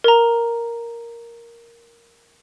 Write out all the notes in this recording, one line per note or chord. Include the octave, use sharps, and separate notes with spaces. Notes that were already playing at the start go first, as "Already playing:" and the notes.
A#4 A#5